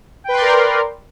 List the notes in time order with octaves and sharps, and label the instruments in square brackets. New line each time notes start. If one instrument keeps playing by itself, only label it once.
[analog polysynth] G5
B4
C6
D5
A#4